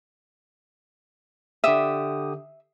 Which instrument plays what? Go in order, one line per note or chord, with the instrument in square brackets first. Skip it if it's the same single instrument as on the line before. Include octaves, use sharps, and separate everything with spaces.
[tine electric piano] D3 G4 D#6 [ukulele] E5